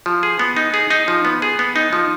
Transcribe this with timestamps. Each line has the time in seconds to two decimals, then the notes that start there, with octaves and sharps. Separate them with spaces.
0.06 F3
0.23 G#4
0.39 B3
0.57 D#4
0.74 G#4
0.90 D#4
1.08 F3
1.25 B3
1.42 G#4
1.59 B3
1.76 D#4
1.93 F3